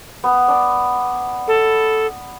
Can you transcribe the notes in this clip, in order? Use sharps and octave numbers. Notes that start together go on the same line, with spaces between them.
B3
D4
A4